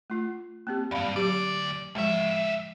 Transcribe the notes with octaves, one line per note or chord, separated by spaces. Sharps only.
A3 F4
A#3 C4 G4
E2 G2 D5 F5 B5
D2 F#3 G4 D5
C#2 F3 G#3 E5